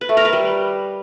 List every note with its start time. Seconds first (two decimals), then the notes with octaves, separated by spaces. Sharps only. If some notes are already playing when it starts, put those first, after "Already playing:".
0.01 B4
0.09 A3
0.17 A#4
0.25 B4
0.33 G3